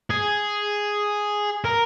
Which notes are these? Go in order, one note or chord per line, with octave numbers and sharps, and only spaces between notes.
G#4
A#4